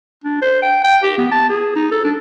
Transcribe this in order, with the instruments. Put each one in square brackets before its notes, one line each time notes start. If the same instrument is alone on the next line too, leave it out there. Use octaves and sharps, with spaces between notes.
[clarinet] D4
C5
G5
G5
G4
B3
A5
G#4
D#4
A4
D4